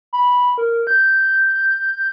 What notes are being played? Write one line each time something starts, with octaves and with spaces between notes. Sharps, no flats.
B5
A#4
G6